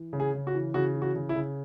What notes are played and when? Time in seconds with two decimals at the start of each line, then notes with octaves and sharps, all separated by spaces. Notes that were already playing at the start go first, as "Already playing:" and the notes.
Already playing: E3
0.13 C#3
0.20 G#4
0.34 C#3
0.47 F#4
0.54 E3
0.74 C#3 F#4
0.95 E3
1.02 F#4
1.16 C#3
1.29 E4
1.35 C#3